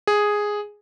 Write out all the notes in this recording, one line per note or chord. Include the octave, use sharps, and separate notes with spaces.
G#4